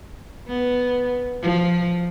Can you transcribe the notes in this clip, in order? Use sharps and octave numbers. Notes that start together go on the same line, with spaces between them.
B3
F3